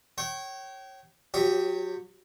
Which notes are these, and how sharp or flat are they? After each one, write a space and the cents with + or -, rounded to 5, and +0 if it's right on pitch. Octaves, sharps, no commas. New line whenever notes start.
C#5 -20 G5 -35
F#3 -30 G4 +0 C#5 +0